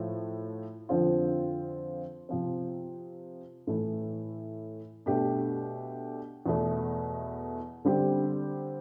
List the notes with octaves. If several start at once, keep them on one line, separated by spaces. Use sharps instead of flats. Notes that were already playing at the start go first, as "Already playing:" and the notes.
Already playing: A2 F3 A3
F2 D3 F3 C4 F4
C3 F3 C4
A2 E3 A3
B2 A3 D4 G4
E2 B2 A3
D3 G3 C4 G4